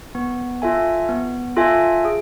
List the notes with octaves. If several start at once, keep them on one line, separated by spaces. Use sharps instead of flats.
B3
F4 A4 E5 G#5
B3
F4 A4 E5 G#5
G#4